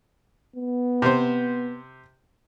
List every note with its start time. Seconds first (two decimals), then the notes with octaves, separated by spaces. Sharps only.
0.56 B3
1.02 C3 C5